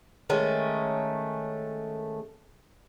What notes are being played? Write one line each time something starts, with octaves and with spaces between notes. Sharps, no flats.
D#3 G#3 A3 C#4